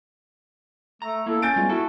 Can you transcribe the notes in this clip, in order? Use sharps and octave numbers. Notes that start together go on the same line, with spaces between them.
A3 A#5
A#3 E4 A4
C#4 G6 A6 D7
G3 G#3 B3 F4
E4 F#4 A4 A5